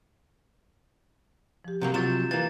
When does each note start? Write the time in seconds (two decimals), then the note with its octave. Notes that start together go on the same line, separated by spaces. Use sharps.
1.64 F3 G4
1.81 C3 F#3 A#3 G6
1.94 C3 F#3 F4 C6 G6 A6 E7
2.31 E3 A#3 A6